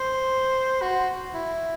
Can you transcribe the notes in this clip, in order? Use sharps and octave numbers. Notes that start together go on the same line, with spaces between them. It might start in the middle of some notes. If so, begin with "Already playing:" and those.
Already playing: C5
F#4
E4